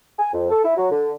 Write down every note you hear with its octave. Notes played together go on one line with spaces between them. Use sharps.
G#5
F2
A4
E4
F#3
D3